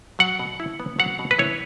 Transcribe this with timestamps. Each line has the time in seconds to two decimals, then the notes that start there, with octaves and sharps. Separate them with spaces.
0.19 F#3 F#5
0.39 B2
0.60 E4
0.80 B3
0.99 F#3 F#5
1.19 B2
1.31 B4
1.38 E4 C#5